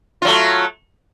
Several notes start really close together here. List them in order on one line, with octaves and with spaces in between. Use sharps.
F4 F#3 A3